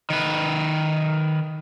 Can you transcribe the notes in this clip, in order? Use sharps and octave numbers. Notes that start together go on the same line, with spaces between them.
D#3 B4